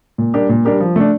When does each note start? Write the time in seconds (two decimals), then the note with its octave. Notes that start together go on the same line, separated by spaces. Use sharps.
0.18 A#2
0.34 G3 D4 G4 A#4
0.49 A#2
0.65 G3 D4 G4 A#4
0.80 F3
0.96 A3 D4